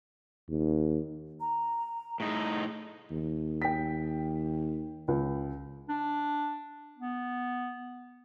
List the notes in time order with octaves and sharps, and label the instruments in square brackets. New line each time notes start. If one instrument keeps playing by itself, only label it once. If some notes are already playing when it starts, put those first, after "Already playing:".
[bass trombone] D#2
[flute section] A#5
[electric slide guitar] A2 D#4 [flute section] G#4
[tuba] D#2
[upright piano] G5 B6
C#2
[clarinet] D4
B3